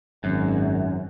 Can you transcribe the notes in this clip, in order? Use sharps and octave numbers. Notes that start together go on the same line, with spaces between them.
G#1 F#2